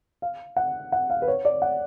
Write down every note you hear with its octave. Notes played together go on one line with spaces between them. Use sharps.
F5
F#5
F#5
F5
B4
C#5
D5
F#5